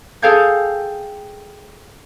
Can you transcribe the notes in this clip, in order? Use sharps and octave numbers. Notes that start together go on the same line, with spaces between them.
G#4 A4 F5 G5 G6 G#6